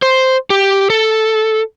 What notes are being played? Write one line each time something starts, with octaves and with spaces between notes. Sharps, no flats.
C5
G4
A4